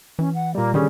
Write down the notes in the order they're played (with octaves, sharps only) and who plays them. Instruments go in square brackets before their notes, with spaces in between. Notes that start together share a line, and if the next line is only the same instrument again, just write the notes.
[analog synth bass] E3 [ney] C#4
[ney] F#5
[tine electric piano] A#2 G3 [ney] A#3
[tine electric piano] D3 G3 G#4 [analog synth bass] D#3 [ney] C#4